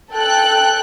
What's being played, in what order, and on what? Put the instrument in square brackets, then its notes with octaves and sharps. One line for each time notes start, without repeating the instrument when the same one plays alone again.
[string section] A4 G5 F#6